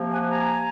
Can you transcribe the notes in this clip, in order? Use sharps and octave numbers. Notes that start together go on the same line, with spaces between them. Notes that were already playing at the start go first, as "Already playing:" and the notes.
Already playing: C3 F3 A#3
F#5 G#5
G#5 A#5